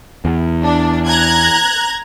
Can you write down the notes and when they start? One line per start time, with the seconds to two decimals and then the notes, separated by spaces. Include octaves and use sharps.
0.25 E2
0.63 D4
1.07 A#5 F#6 G#6